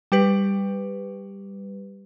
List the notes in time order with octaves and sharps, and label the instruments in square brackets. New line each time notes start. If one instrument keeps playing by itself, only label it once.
[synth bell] G3 G4 B4